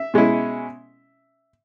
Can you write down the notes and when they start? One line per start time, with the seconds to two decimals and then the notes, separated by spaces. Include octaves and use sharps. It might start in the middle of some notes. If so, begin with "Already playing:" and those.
Already playing: E5
0.14 B2 G#3 C#4 E4